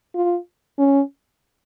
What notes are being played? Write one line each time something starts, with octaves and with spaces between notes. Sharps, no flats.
F4
C#4